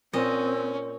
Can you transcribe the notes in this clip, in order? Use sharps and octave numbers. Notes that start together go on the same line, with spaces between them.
A#2 C4 C#4 D#5